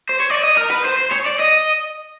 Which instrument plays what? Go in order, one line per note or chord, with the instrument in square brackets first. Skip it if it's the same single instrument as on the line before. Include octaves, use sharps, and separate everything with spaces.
[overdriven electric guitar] C5
C#5
D5
D#5
A#4
B4
C5
C5
C#5
D5
D#5